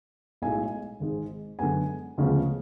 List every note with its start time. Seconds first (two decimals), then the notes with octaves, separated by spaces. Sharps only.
0.42 B1 A2 G#3 G#5
1.00 G#1 G#2 G#3
1.59 F#2 D3 G#3 B3 G#5
2.18 D2 C#3 F3 G#3 B3